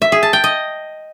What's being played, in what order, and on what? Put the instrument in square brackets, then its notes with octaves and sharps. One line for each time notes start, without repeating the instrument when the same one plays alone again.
[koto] E5
G#4
A5
G5
D#5